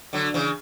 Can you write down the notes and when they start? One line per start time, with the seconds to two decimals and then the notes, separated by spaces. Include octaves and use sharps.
0.13 D3 F#3
0.34 C#3 E3